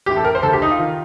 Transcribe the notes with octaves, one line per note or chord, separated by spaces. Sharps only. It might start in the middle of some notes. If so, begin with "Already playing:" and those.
A1 A2 G4
A4
A#4
C5
D2 D3 A4
G4
D#4
F4
D#3